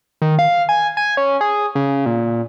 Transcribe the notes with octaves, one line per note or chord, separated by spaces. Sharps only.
D#3
F5
G#5
G#5
C#4
G#4
C#3
A#2